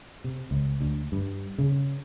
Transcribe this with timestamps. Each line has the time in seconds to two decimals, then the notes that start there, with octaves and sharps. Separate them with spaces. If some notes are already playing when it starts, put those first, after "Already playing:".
0.24 C3
0.51 C#2
0.81 D2
1.12 G2
1.58 C#3